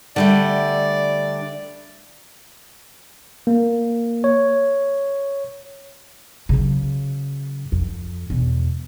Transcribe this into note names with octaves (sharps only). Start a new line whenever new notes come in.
D3 G3 A3 D5
A#3
C#5
C#3 F#3
F2
E2 B2